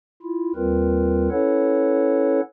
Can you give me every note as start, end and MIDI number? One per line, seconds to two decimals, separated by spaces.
0.22 0.52 64
0.22 0.52 65
0.56 1.29 39
0.56 1.29 55
0.56 1.29 60
0.56 1.29 65
0.56 1.29 70
0.56 1.29 71
1.31 2.40 61
1.31 2.40 64
1.31 2.40 69
1.31 2.40 71
1.31 2.40 73
1.31 2.40 78